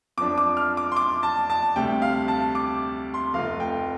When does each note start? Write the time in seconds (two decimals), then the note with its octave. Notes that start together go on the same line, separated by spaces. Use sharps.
0.17 F2 F3 D4 D6
0.38 D6
0.57 F6
0.77 D6
0.92 C6
0.97 D6
1.23 A5
1.50 A5
1.76 D2 C3 G3 G5
2.02 F5
2.28 A5
2.55 D6
3.14 C6
3.34 F1 F2 C3 A3 F4 F5
3.60 G5